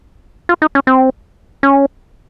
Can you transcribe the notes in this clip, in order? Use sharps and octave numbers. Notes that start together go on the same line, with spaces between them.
F4
D#4
C#4
C4
C#4